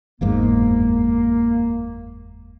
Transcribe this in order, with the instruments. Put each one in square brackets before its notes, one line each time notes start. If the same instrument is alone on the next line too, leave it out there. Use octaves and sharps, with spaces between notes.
[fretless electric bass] F#1 E2 G#2 [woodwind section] A#3